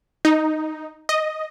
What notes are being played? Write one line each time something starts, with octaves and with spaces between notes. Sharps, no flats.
D#4
D#5